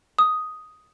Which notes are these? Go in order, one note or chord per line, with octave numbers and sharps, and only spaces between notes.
D#6